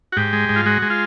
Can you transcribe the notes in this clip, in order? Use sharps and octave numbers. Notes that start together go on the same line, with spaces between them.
F#4
G#2 G4
G#3
G#2
F4
G#3 F#4
G#3
F4